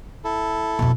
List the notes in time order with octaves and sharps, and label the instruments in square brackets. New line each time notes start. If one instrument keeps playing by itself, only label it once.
[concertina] E4 A4
[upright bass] F2 B2